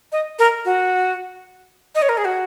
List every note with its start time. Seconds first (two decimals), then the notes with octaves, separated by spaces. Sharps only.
0.12 D#5
0.39 A#4
0.65 F#4
1.95 D#5
2.02 C#5
2.09 A#4
2.18 G#4
2.25 F#4